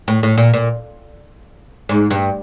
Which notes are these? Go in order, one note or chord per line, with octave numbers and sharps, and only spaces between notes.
A2
A2
A#2
A#2
G#2
G2